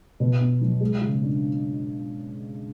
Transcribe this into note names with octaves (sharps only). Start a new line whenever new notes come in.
B2
B3
F#3
G#3
C#3
D4